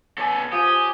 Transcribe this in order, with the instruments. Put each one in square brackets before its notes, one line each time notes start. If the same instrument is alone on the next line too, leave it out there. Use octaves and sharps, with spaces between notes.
[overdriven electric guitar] B3 A4 [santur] C#5 D5 G#5
[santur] C#4
[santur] F3 [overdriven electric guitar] G4 [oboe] D#6